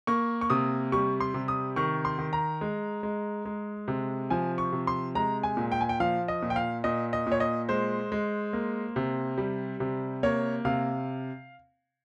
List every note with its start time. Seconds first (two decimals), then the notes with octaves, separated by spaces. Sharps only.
0.07 A#3 C#6
0.41 C#6
0.50 C3 D#6
0.92 G3 C#6
1.20 C6
1.34 C3
1.48 D#6
1.76 D#3 C#6
2.05 C6
2.19 D#3
2.33 A#5
2.61 G#3
3.03 G#3
3.45 G#3
3.88 C3
4.30 F3 G#5
4.58 C#6
4.72 C3
4.87 C6
5.15 G#3 A#5
5.43 G#5
5.57 A#2
5.72 G5
5.81 G#5
5.89 G5
6.00 F3 F5
6.28 D#5
6.42 A#2
6.50 G5
6.56 F5
6.84 A#2 D#5
7.13 D#5
7.27 A#2
7.32 C#5
7.40 D#5
7.69 G#3 C5
8.12 G#3
8.53 A#3
8.96 C3
9.38 G3
9.80 C3
10.23 A#3 C#5
10.65 C3 F5